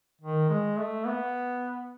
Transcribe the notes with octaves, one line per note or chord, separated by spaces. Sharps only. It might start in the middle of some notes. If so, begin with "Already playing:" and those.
D#3
G#3
A3
B3